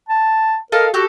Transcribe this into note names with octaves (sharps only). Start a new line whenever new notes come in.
A5
A4 A#4 D#5 F5
F#4 G4 A4